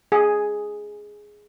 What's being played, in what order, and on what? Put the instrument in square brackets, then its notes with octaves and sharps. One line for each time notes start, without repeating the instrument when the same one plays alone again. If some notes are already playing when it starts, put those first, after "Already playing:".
[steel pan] G#4